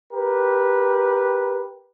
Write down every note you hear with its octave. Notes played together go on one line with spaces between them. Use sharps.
G4 A#4 B4